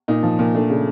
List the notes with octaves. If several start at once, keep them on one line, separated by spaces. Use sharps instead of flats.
A#2 D#4
F3
A#2
A3 D4
C#3